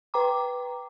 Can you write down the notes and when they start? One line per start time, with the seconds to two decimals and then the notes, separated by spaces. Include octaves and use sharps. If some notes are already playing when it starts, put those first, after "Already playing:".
0.14 B4 G5 A#5 D6